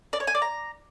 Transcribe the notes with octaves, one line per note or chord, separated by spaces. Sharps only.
D5
C#5
G#5
D5
A#5